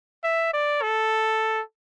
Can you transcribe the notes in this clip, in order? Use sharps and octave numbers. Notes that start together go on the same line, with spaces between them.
E5
D5
A4